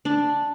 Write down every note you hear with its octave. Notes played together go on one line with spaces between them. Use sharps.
D4